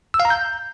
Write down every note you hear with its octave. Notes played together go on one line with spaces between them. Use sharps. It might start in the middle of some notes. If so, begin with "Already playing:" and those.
E6
F5
A#5
G6